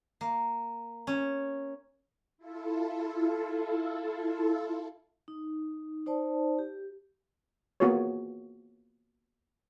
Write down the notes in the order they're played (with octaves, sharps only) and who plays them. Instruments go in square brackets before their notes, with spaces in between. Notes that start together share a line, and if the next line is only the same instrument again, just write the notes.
[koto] A#3
C#4
[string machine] E4 F4 A4
[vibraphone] D#4
D#4 C5 D5 A5
G4
[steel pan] A#3 B3 F4 F#4 G#4 C#5